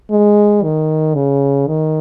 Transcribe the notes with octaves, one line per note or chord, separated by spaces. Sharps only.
G#3
D#3
C#3
D#3